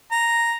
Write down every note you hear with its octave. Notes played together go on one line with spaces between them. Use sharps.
A#5